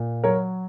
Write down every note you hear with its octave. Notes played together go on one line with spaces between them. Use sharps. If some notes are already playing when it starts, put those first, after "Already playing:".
Already playing: A#2
F#3 A#4 C#5